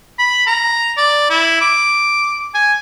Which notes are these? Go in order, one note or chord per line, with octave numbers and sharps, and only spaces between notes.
B5
A#5
D5
E4
D6
G#5